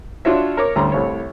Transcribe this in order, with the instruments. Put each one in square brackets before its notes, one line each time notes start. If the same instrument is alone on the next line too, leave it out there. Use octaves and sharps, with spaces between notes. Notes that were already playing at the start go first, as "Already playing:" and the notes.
[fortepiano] D4 F4 F#4 C#5 E5
A#4 C#5 D6
D2 G3 C#4 A#5 C6
C2 A2 C#5